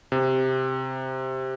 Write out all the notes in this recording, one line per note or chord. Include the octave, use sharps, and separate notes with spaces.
C3